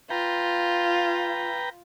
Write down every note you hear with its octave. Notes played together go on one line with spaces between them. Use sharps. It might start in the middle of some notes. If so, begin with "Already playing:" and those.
F4 B4 G5 A#5